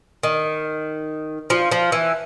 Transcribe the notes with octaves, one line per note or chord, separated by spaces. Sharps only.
D#3
F3
F3
E3